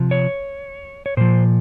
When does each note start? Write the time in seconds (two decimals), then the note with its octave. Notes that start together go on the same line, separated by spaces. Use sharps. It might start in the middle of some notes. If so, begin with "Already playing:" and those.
Already playing: C3 F3
0.11 C#5
1.06 C#5
1.17 A#2 F3 C5